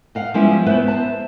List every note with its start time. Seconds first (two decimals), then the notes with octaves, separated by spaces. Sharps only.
0.15 D#5 F5 F#5
0.34 F3 G3 G#3 B3 C#4 E4
0.66 A3 B3 B4 C5 E5
0.88 C5 E5 A5